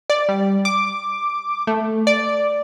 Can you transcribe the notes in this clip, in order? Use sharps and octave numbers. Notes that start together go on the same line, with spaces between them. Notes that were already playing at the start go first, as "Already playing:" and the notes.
D5
G3
D6
A3
D5